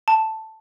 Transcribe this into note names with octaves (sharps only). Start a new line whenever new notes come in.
A5